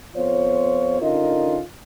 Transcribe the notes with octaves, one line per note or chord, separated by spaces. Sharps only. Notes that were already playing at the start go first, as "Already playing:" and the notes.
F2 B3 F4 C5 C#5
D3 C#4 D#4 F4 A#4 D#5